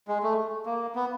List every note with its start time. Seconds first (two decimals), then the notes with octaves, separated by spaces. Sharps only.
0.08 G#3
0.23 A3
0.66 A#3
0.95 B3